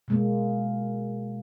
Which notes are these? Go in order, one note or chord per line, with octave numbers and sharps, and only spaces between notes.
B2 G#3 A#3